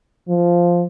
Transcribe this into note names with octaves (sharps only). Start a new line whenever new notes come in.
F3